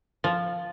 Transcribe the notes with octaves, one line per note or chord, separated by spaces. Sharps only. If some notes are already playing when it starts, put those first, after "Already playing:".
F3